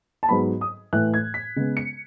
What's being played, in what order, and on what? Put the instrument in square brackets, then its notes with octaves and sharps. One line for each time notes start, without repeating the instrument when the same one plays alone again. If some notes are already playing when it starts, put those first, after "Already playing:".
[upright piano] A5
G#2 F#3 B3 B5
D#6
A2 E3 A3 F#6
G#6
B6
C#3 G#3 B3
C#7